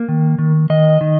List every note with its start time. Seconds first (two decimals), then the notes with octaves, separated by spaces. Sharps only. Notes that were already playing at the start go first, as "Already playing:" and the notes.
Already playing: A#3
0.09 D#3
0.39 D#3
0.70 D#3 D#5
1.01 D#3